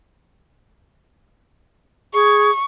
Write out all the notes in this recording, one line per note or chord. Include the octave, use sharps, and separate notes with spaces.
G#4 C#6